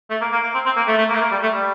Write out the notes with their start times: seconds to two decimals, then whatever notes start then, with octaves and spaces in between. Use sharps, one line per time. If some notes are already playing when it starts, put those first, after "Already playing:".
0.11 A3
0.21 A#3
0.32 A#3
0.43 A#3
0.54 C4
0.66 C4
0.77 A#3
0.88 A3
0.98 A3
1.09 A#3
1.15 A3
1.21 A#3
1.31 G3
1.43 A3
1.54 G3